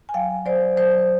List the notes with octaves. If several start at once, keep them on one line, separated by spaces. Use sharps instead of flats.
G#5
F#3 F5 G5
F#3 C5 D5
F#3 C5 D5